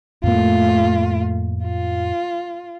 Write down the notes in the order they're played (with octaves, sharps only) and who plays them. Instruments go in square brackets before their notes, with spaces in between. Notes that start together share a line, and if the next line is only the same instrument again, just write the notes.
[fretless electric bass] F2 A2 A#3 [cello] A3 F4
[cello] F4